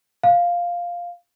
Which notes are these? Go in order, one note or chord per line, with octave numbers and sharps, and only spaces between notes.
F5